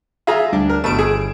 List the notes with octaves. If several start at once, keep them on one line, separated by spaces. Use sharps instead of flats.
F4 G#4 E5 A#5
D2 G3 D4
A#4
G1 B2 A3 D7 E7
G#4